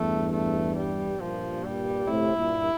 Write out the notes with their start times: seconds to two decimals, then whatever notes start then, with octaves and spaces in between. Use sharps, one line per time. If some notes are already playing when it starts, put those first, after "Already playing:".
Already playing: E2 G2 A3
0.33 A3
0.76 G3
1.19 G2 A#2 F3
1.64 G3
2.07 A2 C3 E4
2.36 G2 A#2